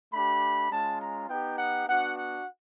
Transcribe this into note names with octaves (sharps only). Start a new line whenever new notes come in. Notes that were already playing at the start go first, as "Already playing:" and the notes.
A3 D4 G4 B5
G#3 C#4 F4 A5
A#5
B3 D#4 G4 G5
F#5
B3 D4 F#4 F#5
F#5